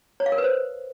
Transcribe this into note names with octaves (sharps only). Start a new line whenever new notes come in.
C#5
F5
A#4
B4
C5